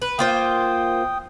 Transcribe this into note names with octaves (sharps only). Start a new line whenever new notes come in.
B4
A#3 F4 C5 G5 D#6